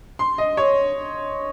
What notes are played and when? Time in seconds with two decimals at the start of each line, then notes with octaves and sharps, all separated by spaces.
0.19 C6
0.38 D#5
0.57 C#5